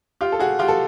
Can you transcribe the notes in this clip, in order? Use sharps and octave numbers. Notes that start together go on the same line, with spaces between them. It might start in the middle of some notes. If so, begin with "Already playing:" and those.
F4 G4
A4
F#4 G#4
F4 G4
A4